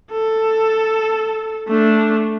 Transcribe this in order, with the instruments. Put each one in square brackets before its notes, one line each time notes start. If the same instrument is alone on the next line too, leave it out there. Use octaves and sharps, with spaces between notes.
[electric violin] A4
A3 D4